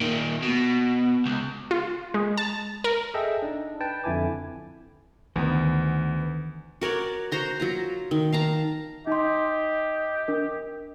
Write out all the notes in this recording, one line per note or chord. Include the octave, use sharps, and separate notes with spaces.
A#2 D#3
B2
C#2
F4
G#3
A5
A#4
G#4 A4 D#5 E5 G5 E6
D4 D#4
B4 G5 A5
F2 D3 E4 G#5 D6
D2 D#3 E3 B3
F#4 A#4 C#5 D5
F#4 C5 A#5 C6
F#3 F4 A#5
D#3
F5 A5 A#5
D#4 G4 D#5 C6
D4 A#4